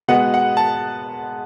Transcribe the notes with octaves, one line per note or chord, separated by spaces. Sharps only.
B2 G#3 B3 F#5
F#5
A5